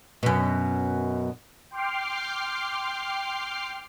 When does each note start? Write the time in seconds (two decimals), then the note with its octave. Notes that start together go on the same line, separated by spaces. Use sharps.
0.23 F#2 B2
1.70 G5 C6 D6 F6 C7